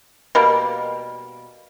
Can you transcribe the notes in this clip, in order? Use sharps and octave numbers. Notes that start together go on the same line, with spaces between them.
B2 G3 A#3